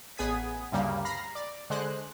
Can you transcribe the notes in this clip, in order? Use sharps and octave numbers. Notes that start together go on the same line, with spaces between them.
A1 B3 G#4 D#6 G#6 B6
D2 G2 C#3 G3 A#3
A#5 B5 F6 A#6 C7
D5
D3 G#3 C5 F#6